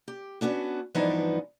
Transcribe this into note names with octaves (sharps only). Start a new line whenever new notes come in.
G4
B3 C#4 D4 F#4
G2 E3 F3 B3 D4 D#4